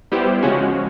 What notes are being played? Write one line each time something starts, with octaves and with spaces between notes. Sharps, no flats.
G3 B3 E4 G4 C5
C#3 F3 G#3 C#4 F#4